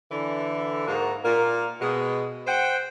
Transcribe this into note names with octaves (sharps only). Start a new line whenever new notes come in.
D3 E3
G#2 A#3 D#4 F#4
A#2 A#3
B2 G#3
C5 F#5 G5